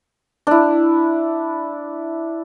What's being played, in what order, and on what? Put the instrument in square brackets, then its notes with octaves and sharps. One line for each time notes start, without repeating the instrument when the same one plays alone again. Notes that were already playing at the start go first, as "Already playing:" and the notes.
[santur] D4 E4